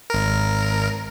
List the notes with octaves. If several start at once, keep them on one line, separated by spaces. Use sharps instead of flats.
G#1 A#4